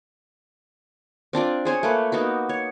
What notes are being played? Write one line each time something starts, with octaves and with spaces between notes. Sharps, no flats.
C4 D4 F4 D5
G#4 C5 C#5 G#5
A3 A#3 B4
A#3 B3 D#4 F#4
C#5